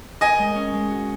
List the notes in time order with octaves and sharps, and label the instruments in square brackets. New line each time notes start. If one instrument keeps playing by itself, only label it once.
[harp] D#3 [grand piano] D#5 G#5
[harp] G#3
C#4
G#3
F#4